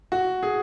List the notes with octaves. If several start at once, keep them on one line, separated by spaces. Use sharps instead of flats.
F#4
G#4